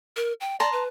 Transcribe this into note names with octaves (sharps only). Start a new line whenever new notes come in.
A#4
G5
D5 A5 A#5 C6
B4